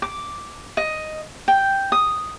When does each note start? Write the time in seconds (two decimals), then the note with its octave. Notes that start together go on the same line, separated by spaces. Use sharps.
0.02 D6
0.77 D#5
1.48 G5
1.92 D#6